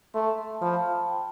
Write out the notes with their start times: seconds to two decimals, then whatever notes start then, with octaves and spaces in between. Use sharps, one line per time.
0.14 A3 C6
0.38 C6
0.55 A5
0.62 F3 B5
0.74 A5
0.86 A5
0.97 A5
1.09 G5